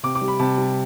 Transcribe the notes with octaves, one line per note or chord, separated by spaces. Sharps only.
C3 D6
D6
G3
B5
C3 A5
G3